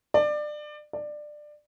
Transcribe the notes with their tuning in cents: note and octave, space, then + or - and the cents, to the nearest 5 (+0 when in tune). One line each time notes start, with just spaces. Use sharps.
D5 +25
D5 +20